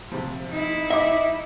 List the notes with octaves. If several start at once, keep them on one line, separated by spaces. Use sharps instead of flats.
C3 F3
D#4 E4
D#5 E5 D6